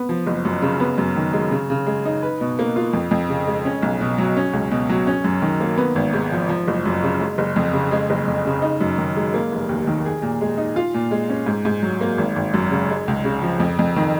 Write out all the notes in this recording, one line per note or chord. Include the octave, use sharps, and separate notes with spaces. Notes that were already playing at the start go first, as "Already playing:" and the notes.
Already playing: B3
F3
F#1
F#2
C#3
B3
F#2
D#3
G#3
C#3
C#3
G#3
D#4
B4
B2
A#3
F4
F2
F2
C#3
G#3
C#4
B1
B2
F#3
C#4
C#2
B2
F#3
C#4
F#2
D#3
A#3
B3
G#1
G#2
F3
F3
F#1
F#2
C#3
G#3
F#1
F2
C#3
G#3
F#1
F2
C#3
D#4
F#2
D#3
G#3
A#3
F1
D#2
D#3
G#4
A#2
G#3
D#4
F4
A#2
G#3
C#4
G#2
G#2
F#3
A#3
G#1
G#1
F#2
C#3
G#3
C#2
C#3
F3
F2
F2
D#3